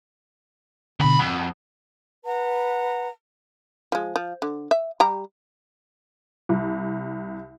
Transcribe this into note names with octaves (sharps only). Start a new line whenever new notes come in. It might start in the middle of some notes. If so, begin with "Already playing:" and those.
D2 B2 D3 B5
F2 F#5
B4 F#5 A#5
F3 G#3
F3
D3
E5
G3 G4 A#5
C2